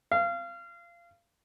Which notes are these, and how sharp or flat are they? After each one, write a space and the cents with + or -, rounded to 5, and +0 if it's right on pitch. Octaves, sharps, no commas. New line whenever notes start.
F5 -25